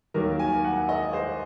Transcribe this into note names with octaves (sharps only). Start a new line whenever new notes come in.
D#2 D#3 F#3 A#3 A#4
G#5
F#5
D#5
C5